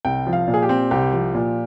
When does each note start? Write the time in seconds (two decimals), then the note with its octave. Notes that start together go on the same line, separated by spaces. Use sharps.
0.05 C2 G5
0.27 F3
0.33 F5
0.48 A#2
0.54 G#4
0.62 G4
0.69 C4
0.91 C2 G4
1.13 F3
1.34 A#2